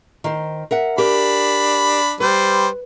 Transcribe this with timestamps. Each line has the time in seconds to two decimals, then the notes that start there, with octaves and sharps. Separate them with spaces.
0.24 D#3 C5
0.71 A#4 E5 F#5
0.98 D4 G4 A#4 B5
2.20 G3 B4 C5